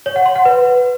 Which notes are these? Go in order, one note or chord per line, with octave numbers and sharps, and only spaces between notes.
C#5
F#5
C6
F#5
B4